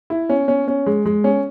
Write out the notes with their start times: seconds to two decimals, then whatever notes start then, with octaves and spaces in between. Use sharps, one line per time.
0.10 E4
0.29 C#4
0.48 C#4
0.68 C#4
0.86 G#3
1.06 G#3
1.24 C#4